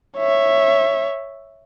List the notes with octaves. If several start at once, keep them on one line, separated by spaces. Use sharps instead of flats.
C#5 E5